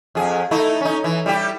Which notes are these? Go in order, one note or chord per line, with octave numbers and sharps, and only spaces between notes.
F2 G#4
A3 D#4 E4
C#4 D#4
E3
G3 E4 G4